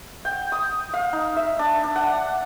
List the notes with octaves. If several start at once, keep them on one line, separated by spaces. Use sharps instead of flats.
G5
D#6
F5
D#4
E5
D4
D4
F#5